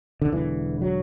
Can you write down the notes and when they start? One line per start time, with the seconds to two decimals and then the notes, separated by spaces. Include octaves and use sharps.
0.22 D3
0.32 E1 E2 D3 E3
0.82 F#3